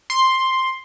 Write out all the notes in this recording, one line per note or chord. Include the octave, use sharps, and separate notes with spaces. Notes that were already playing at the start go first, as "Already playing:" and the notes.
C6